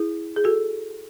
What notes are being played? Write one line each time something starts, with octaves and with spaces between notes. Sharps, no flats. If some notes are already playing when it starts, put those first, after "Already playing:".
Already playing: E4 G#4
G#4
F#4 A4